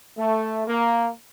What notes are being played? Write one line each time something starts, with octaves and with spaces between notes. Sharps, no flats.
A3
A#3